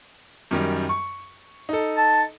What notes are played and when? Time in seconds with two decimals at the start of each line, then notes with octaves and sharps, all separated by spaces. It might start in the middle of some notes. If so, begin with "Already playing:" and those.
0.51 F#2 D#3 G3
0.89 C#6
1.69 D#4 A4
1.97 A5